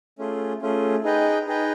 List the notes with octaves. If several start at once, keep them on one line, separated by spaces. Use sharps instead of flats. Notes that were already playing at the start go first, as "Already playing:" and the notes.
A3 C#4 F4 G#4
A3 C#4 F4 G#4
D#4 G#4 B4 D#5 G5
D#4 G#4 B4 D#5 G5